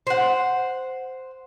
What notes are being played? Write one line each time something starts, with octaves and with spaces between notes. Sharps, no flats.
C5 F#5